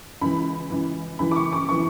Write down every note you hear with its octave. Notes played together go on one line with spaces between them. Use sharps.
C#2 C#3 E3 B5
C#2 C#3 E3
C#2 C#3 E3 B5
D6
C#6
D6
C#3 E3 C#6